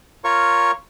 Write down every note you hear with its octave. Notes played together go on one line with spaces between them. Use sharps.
F4 A#4 C#5 C#6